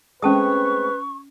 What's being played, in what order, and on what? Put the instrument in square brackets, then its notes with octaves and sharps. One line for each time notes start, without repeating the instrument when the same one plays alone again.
[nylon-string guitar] G#3 A3 C4 [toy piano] C#4 A5 D#6 [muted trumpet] B4 [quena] C#6